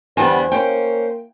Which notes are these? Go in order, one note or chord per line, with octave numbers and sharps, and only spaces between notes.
E2 D3 G3 B3 C5 G#5 A5
A#3 C#4 C5 G5